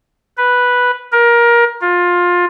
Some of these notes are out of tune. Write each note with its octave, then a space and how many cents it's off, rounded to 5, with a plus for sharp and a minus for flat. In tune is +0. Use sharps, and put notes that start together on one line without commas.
B4 -5
A#4 +20
F4 +20